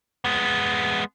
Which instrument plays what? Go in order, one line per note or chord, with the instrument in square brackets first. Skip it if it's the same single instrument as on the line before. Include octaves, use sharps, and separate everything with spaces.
[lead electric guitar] G#3 B3